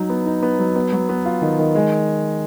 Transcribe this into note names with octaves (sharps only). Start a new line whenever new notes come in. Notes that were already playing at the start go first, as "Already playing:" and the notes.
Already playing: F#3 D#4
B3
D#4
B3
F#3
B3
F#3
B3
F4
D#3
D#3
G#3